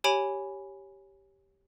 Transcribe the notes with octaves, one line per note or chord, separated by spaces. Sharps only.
G4 C#5 G#5 B5 D7